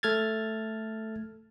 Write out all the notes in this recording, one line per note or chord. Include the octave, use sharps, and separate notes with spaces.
A3 A4 F6 G#6 A6